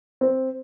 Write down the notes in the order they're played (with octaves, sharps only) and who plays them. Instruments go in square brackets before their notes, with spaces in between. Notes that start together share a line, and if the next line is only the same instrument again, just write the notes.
[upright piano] C4